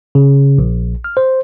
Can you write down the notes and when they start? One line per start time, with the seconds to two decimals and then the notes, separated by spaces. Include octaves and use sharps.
0.15 C#3
0.58 A#1
1.04 F6
1.17 C5